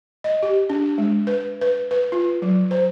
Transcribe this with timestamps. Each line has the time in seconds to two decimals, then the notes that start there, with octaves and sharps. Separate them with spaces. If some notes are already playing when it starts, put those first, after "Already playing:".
0.24 D#5
0.43 G4
0.70 D4
0.98 G#3
1.27 B4
1.61 B4
1.91 B4
2.12 F4
2.42 F#3
2.71 C5